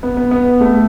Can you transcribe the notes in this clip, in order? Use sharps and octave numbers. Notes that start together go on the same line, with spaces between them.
B3
B3
B3
A3